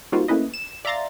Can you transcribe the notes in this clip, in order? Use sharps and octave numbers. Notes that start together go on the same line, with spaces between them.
G3 A#3 C4 D#4 F4 F#4
A3 A#3 C#4 E4 B4 D#5
E7
D5 E5 F5 A#5 C6 A6